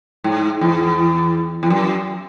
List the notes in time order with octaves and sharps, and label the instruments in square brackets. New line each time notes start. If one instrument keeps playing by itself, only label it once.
[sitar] G#2
E2
E2
F#2